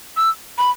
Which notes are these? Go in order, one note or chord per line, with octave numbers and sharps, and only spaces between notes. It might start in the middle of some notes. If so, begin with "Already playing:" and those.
E6
B5